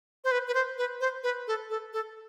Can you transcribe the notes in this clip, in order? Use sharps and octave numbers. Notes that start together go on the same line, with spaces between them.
C5
B4
B4
C5
B4
C5
B4
A4
A4
A4